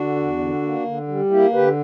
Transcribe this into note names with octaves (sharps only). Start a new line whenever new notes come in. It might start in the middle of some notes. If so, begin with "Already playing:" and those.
Already playing: D3 D4 F#4
E2
D3
A#3
D3
G3
A#3 E4 G4
D3 G4 B4